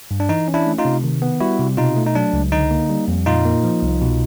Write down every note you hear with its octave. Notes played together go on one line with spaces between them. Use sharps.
G2
D4
E3 D#4
C#4
D4 E4
A3
D#4 F4
C3
D#3
B3
G3 E4 F#4
C3
B2 D#4 F4
A3
D#4
F#3 D4
C#2
D3 D#4
A#3
G3
F2
A#2 D#4 F4
A#3
F3
C2
B2